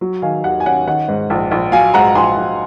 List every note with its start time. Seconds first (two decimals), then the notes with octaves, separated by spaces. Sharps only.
0.01 F#3
0.22 D#3 F5 G#5
0.44 D#2 F#5
0.60 G#5
0.66 C#4 F#5
0.87 D#3 F#5
1.08 G#2
1.30 A#1
1.51 A#1
1.72 F#3 F5 G#5
1.94 G#2 F#5 A#5
2.15 A#1 G#5 C6
2.36 A#1